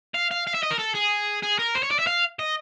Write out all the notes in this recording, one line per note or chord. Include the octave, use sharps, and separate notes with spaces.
F5
F5
F5
E5
D#5
A#4
A4
G#4
G#4
A#4
C5
C#5
D5
E5
F5
D#5